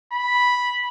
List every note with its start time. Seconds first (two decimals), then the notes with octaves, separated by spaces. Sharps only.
0.12 B5